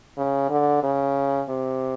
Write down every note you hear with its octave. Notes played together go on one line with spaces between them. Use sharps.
C#3
D3
C#3
C3